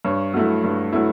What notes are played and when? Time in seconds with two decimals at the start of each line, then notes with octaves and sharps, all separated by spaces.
0.05 G2 C#5
0.34 F#3 A3 E4
0.64 G2
0.93 F#3 A3 E4